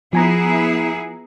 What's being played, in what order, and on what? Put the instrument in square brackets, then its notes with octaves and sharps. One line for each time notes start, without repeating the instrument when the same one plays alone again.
[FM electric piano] F3 G#5 A#5 [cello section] B3 E4 G#4